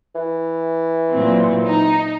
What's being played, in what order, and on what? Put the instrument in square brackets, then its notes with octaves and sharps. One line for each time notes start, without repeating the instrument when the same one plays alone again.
[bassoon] E3
[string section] A#2 F#3 C4
D#4